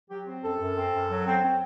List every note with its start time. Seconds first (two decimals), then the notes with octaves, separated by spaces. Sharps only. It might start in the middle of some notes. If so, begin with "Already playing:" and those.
0.10 F#3 G4
0.26 C4
0.44 F#2 A4
0.59 F#2
0.77 C4
0.94 F#2
1.09 F#3
1.26 C4
1.43 C4